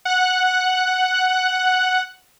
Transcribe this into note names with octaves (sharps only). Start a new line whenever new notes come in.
F#5 F#6